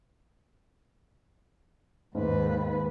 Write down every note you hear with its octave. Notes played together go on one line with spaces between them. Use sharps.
D#2 G#2 B4